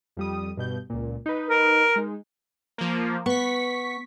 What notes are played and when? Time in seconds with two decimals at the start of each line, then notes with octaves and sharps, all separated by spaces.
0.17 F2 G3 D#6
0.57 G2 B2 G6
0.90 C#2 A#2
1.26 D#4 B4
1.50 A#4
1.96 G#3 D#4
2.78 F3 A#3
3.26 B3 C#6 B6